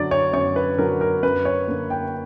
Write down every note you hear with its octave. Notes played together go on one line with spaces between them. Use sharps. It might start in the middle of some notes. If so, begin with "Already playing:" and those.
Already playing: F#2 D3 F#3 D5
C#5
F#2 C#5
B4
D3 F#3 A#4
A#4
F#2 B4
C#5
D3 A#3
G5